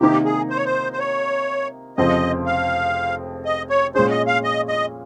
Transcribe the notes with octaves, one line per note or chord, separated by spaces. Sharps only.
C3 D#3 A#3 D#4 G4 A#4
G#4
C5
C#5
C5
C5
C#5
F1 F2 C#3 F3 C4 D#5
F5
D#5
C#5
A#2 G#3 C#4 G#4 C5
D#5
F5
D#5
D#5